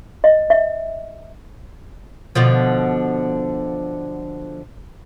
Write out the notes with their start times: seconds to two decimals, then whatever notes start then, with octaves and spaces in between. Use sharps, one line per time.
0.24 D#5
0.50 E5
2.35 B2 D3 F3